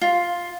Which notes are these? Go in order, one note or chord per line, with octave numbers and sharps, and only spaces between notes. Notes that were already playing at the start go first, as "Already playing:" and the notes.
F4